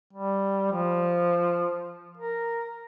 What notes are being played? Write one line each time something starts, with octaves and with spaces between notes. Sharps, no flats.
G3
F3
A#4